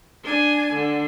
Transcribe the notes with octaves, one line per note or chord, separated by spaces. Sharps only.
D4 G#5
D3